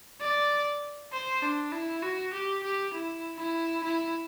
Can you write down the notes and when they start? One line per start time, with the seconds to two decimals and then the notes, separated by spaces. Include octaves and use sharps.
0.21 D5
1.13 C5
1.43 D4
1.72 E4
2.02 F#4
2.33 G4
2.64 G4
2.94 E4
3.39 E4
3.84 E4